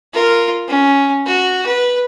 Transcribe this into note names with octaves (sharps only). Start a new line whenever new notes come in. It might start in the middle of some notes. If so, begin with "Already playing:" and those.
F4 A#4
C#4
F#4
B4